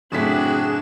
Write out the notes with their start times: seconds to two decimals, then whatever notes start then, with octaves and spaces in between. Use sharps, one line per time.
0.12 F#1 A2 C4 D4 F#4 G#4 B6 E7